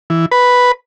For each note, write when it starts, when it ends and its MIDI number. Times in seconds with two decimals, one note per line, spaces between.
0.10 0.26 52
0.32 0.72 71